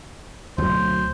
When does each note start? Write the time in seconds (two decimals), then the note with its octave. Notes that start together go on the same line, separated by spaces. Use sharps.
0.58 D2 B2 F#3 C5